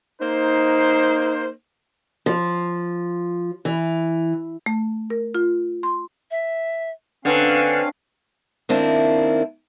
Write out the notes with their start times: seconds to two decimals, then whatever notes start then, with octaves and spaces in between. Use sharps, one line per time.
0.21 A#3 D#4 C5
2.26 F3
3.65 E3
4.66 A3
5.10 A#4
5.35 F4
5.83 C6
6.31 E5
7.25 D3 C4 C#4 B4 F5
8.69 D#3 A#3 C4 D4 E4